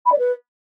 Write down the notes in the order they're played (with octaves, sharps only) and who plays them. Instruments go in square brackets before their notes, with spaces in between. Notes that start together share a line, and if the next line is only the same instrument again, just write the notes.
[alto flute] B5
D5
B4